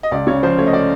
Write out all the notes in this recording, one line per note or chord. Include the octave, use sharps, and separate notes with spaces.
D#5
C#2 D5
C#3 C#5
F3 C5
A3 C#5
D#5
D5